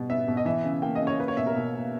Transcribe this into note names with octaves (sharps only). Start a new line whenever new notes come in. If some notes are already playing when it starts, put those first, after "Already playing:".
Already playing: B2 G3
B3 E5
B2
D#5
E3 E5
C#3
A#3 G5
D#5
C#3
C#5
A#3 B4
C#5
B2 E5
A#4
B2
A#3